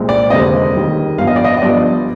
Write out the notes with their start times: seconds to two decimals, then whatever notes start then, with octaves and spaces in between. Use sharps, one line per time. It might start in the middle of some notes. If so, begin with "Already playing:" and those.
Already playing: C2 A#2 G#3 C4
0.09 D5
0.30 F1 D#2 D3 G#3 C4 D#5
0.75 D#2 D#3 G3
1.18 G1 G2 F3 F5
1.27 D#5
1.36 D5
1.44 D#5
1.57 D#5
1.62 G1 G2 F3 D5